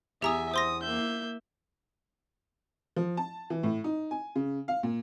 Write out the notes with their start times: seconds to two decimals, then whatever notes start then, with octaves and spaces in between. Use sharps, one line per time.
0.22 E2 G4 E5 G#5 A#5 D#6
0.54 C5 C6 D#6 A#6
0.83 A#3 E5 G6
2.96 F3
3.17 A5
3.50 E3
3.63 A2
3.84 D#4
4.11 G#5
4.36 C#3
4.68 F5
4.83 A#2